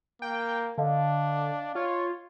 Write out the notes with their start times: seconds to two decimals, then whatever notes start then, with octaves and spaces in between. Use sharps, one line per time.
0.22 A#3 G5
0.78 D3 D4 D#5 F5 A5
1.75 F4 C#5